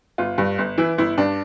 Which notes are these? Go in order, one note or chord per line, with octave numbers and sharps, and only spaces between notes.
G1 F4
G2
G1
E3 E4
G1 E4
G2 D4